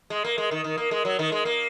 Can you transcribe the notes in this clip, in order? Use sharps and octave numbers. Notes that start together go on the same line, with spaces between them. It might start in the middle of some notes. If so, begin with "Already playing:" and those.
G#3
A#3
G#3
D#3
D#3
A#3
G#3
F#3
D#3
G#3
A#3